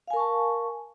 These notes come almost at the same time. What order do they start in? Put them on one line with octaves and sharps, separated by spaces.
F5 G#5 A#4 C#6 A5